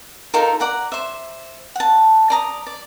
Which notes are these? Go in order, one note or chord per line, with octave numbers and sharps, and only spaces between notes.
D#4 F4 A4 A#4
D5 F#5 A#5
C5 E5
F#5 A5
D5 A#5 D#6
D5